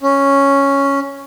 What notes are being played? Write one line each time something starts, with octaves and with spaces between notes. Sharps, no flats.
C#4